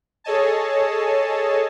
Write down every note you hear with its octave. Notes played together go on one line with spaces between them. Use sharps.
G#4 A4 C#5 D#5 G#5 A5